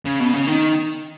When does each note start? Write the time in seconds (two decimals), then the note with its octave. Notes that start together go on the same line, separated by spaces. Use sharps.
0.06 C#3
0.20 B2
0.34 C#3
0.48 D#3